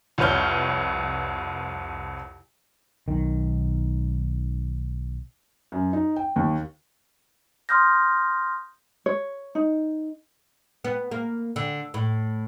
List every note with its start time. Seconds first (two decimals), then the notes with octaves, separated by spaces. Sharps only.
0.18 C2 F2 B4 C#5 F6 G6
3.08 B1 D#3
5.72 F#2
5.93 D#4
6.16 G5
6.36 D#2
7.69 C6 D#6 F6 G6 A#6
9.06 C#5
9.55 D#4
10.84 B3
11.12 A#3
11.56 D3
11.94 A2